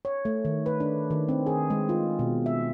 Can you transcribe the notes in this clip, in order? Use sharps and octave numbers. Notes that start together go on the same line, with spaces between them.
C#5
A3
D#3
B4
D4
D#3
C4
G#4
G#3
F4
B2
E5